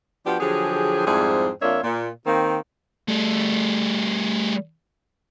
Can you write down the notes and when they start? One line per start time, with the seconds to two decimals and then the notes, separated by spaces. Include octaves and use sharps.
0.26 F3 B3 D4 F#4 G4
0.40 D3 F3 F#3 G4 G#4
1.07 F2 G#2 G3 C4 E4 G#4
1.62 F2 A#3 D4 F4 C#5 E5
1.84 A#2
2.26 D#3 A#3 C4
3.08 G3 A3